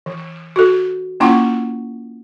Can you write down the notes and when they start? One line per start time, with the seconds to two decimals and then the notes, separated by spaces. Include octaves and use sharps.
0.06 E3
0.56 F#4 A4
1.20 A#3 C#4 E4 F4 F#5 C#6